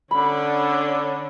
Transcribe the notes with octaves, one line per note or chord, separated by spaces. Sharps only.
D3 C#4 D4 B5